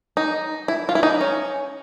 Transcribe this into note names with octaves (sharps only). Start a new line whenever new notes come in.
D#4
E4
F4
E4
D#4
C#4